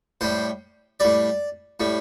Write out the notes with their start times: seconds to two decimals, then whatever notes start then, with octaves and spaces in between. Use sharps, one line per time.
0.21 A2 G3 C5
1.00 A2 G3 D5
1.80 A2 G3